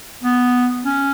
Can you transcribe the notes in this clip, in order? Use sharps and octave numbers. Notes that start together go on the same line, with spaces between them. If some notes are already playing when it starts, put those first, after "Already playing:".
B3
C#4